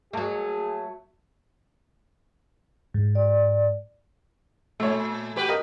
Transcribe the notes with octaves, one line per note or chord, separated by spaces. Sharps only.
F#3 A3 A#3 G#4
G#2
D5
A#2 A3 C#5
F#4 G4 B4
A#4 D#5